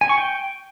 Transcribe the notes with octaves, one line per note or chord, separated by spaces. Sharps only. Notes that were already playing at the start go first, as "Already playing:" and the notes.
G#5
C#6
G5